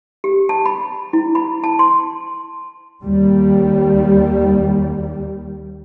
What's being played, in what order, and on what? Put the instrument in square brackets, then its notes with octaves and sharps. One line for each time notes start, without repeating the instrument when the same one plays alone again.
[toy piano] G4
A5
B5
E4
B5
A5
C6
[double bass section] D#2 G3